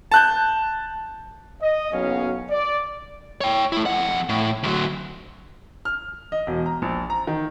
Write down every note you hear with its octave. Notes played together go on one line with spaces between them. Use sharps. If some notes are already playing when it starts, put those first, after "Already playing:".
A5 F#6 G6
D#5
F#1 B1 B2 F#3 C#4 F5
D5
C#5 G5
A3 E4
F2 F#5
A2
D2 F#3
F6
D#5
E1
A#5
A#1
A#5
D#3